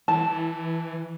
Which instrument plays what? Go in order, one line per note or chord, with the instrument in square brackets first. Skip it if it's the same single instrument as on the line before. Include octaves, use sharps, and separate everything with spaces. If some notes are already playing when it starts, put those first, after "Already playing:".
[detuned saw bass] E3 [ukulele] A5